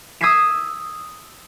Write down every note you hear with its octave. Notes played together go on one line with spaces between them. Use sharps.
D#6 E6 G#6 B6 C7 E7